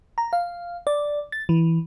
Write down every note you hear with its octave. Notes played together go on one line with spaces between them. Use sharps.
A#5
F5
D5
A6
E3